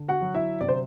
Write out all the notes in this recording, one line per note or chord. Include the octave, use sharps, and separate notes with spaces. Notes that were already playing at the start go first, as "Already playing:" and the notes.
Already playing: D3
F#4 F#5
F#3
E4 E5
C3 D5
C5